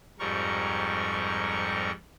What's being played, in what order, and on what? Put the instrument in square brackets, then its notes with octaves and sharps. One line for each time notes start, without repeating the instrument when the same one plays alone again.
[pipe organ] F2 G#2 G3 A#4 C#6